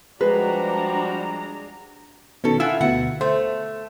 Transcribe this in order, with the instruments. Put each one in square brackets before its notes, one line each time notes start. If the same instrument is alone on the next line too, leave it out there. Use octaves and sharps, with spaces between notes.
[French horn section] F3 G3 F#4 [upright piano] G#3 [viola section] D4 A#5 [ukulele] B4
[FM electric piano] B2 D#3 [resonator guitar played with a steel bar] C#4 A4
[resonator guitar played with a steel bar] E4 F4 [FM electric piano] F#5 G#5 E6
[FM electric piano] D2 B2 [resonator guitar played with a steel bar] F#5
[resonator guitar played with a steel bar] A3 [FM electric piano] C5